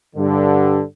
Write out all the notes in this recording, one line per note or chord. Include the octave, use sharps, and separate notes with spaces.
G2 D3